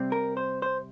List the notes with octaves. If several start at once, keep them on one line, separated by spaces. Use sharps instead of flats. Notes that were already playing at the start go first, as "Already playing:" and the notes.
Already playing: C3 G3 C4
A#4
C5
C5